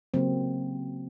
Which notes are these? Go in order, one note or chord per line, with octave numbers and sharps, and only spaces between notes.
C#3 F#3 A#3 C4